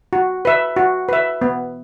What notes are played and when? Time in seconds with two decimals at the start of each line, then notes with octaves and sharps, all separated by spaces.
0.13 F#4
0.45 B4 E5
0.76 F#4
1.09 B4 E5
1.42 B3